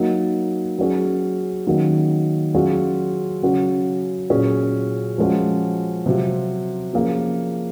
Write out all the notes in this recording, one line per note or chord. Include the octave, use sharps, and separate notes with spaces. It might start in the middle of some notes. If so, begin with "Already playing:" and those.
Already playing: F#3 A#3 D#4
F#3 C#4 G#4
D#3 F#3 A#3 C#4
F#3 C#4 F4 G#4
C#3 F#3 C#4 F#4
A#2 F#3 C#4 G#4
F3 G#3 C#4 F#4
C3 F#3 C4 F4
F3 A#3 C#4 G#4